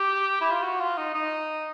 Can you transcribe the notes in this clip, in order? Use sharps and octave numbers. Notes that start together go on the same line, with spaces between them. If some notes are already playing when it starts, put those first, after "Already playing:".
Already playing: G4
E4
F4
F#4
F4
D#4
D#4